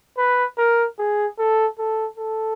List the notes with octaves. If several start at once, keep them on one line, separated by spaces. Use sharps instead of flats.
B4
A#4
G#4
A4
A4
A4